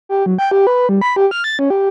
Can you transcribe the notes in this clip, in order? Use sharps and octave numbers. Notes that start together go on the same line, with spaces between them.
G4
F#3
G5
G4
B4
G3
B5
G4
F6
A6
C#4
G4